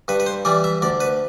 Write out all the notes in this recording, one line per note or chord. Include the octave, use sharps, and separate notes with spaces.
G2 B4
B4
C5
E3 G3 D5
E5
D2 D5
B4